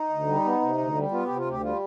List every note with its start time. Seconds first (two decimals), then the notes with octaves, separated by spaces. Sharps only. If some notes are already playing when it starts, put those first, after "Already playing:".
Already playing: D#4
0.09 D2
0.27 G3
0.45 B3
0.61 C3
0.78 D2
0.95 G3
1.11 B3 F4
1.25 C3 G4
1.36 F4
1.45 D2 G4
1.61 G3 F4